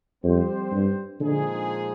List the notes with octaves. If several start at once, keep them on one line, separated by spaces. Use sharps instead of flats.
F2 G3 C4 G4 C5
G2
A#2 D3 F3 G#3 D#4 G#4